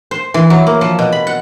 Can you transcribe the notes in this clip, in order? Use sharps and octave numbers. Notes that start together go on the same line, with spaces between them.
C5
E3
F#3
A#3
F3
B2
B5
F#5